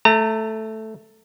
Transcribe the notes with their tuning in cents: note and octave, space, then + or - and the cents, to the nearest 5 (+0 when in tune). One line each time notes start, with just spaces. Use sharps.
A3 +0 A#5 -35